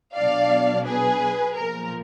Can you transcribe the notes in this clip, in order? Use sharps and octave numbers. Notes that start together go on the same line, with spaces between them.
B1 B2 F#3 D4 D5 F5
G#4 B4
B1 A#2 F3 A#4